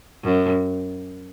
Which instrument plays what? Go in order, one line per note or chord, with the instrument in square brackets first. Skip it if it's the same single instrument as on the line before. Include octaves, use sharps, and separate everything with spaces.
[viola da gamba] F#2